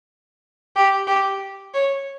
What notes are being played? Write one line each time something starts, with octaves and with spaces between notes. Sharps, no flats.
G4
G4
C#5